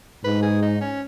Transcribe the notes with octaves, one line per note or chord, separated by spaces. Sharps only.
G#2 B4
G#4
D#4
C#4